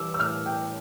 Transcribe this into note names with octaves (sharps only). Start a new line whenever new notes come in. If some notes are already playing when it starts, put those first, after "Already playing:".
Already playing: E3 G3 D6 E6
E6
A2 F6
G5